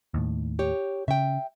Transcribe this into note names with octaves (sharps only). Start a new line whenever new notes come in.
D#2 A2
G4 C#5
C#3 E5 G5